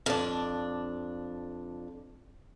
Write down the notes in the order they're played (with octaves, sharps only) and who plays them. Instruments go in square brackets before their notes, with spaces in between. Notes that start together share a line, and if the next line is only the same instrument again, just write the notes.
[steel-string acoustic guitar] F2 D4